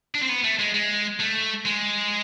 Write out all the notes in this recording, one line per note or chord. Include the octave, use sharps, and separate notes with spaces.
D4
C4
B3
A3
G#3
G#3
A3
G#3